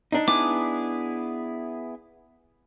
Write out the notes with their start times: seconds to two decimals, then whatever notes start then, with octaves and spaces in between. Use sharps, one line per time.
0.12 D4 D#4
0.28 B3 E4 G#4 D6